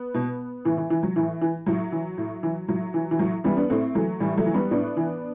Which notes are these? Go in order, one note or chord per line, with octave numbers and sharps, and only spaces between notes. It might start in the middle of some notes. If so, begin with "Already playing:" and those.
Already playing: B3
B2
A2 E3
E3
E3
F#3
A2 E3
E3
A2 F#3
E3
A2
E3
A2 F#3
E3
E3
A2 F#3
E3 G3 B3
B3 D4
A2 A3 C4
E3 F#3 A3
A2 E3 G3
F#3 A3
E3
G3 B3
A2 B3 D4
E3